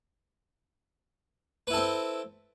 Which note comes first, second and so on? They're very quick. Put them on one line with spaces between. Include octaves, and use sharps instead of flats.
B4 E4 A4 C4